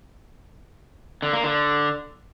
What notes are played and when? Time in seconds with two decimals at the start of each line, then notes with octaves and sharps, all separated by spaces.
1.22 D3
1.33 A#3
1.44 D3